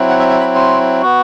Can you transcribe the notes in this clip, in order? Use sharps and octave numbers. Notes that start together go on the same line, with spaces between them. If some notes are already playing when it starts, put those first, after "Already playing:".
Already playing: F#3 C4 E4
F#5
E5
E5
B5
C6
B3 F#4